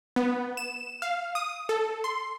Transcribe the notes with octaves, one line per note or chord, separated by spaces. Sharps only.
B3
E7
F5
D#6
A4
C6